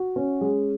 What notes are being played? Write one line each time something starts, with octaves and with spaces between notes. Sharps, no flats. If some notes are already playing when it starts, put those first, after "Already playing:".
Already playing: F#4
C#4
G#3